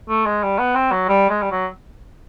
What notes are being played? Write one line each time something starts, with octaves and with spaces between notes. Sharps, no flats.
A3
G#3
G3
B3
C4
F#3
G3
G#3
G3
F#3